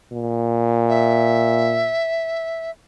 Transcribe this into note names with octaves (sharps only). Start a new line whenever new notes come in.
A#2
E5